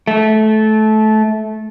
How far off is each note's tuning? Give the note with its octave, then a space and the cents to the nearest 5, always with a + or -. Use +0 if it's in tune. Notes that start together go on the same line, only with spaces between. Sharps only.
A3 -20